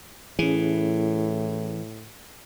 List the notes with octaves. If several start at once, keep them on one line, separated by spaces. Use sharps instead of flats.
A2 E3 C#4 G#4